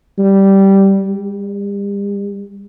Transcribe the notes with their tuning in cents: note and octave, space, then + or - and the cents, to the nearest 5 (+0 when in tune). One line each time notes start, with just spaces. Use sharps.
G3 -10
G3 +40